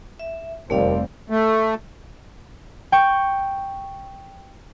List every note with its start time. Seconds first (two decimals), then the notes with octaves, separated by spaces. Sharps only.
0.19 E5
0.70 F1 D#2 G3 A3 C4 D5 F5
1.30 A3
2.92 G5 C#6